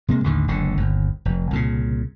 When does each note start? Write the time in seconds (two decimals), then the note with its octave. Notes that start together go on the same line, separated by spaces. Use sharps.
0.08 C3 G#3 A#3
0.24 A1 D#2 D3 D#3
0.48 F#1 C#2 D3
0.77 G1 D#2
1.25 F1
1.51 C2 A#2 C#3